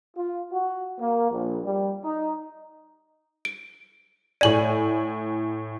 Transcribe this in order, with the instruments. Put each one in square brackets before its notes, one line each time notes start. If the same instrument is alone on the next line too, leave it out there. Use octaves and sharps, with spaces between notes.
[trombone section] F4
F#4
A#3
A#1
G3
D#4
[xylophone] D7
[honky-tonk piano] A2 G#5 D#7 [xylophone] D5 F#7